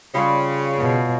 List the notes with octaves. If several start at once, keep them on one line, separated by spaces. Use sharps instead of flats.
C#3 G3 F4 C#5
B2